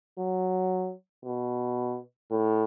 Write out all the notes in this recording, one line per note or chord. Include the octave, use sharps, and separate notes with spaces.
F#3
B2
A2